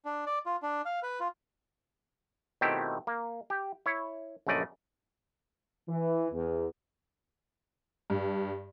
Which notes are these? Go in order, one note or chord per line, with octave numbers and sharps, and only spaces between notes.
D4
D5
F4
D4
F5
B4
F4
B2 D#3 A3 C4 E4 G4
A#3
G4
E4 C#5
A#1 F#2 C#3 A3 D5 D#5
E3
E2
G2